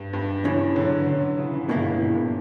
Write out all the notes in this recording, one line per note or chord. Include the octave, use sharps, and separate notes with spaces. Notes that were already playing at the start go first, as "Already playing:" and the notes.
Already playing: G2
G2
E2 C#3 E3
D3 F#3
D3 F#3
C#3 E3
C#3 E3
C#2 G2 B2 A#3 E4
A#2
G2